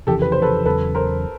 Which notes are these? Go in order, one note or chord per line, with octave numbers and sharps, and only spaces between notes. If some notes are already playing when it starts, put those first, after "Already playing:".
F1 F2 C#3 E3 G4 A4
B4
C5
A4 B4
E2 C#3 F#3 A4 B4
A#4 C5